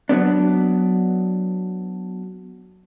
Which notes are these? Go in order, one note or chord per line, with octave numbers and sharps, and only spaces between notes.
F#3 B3 D4